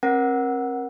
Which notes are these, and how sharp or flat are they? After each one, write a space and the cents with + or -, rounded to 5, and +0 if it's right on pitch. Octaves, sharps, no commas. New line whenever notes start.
C4 +45 A#4 +25 F#5 +0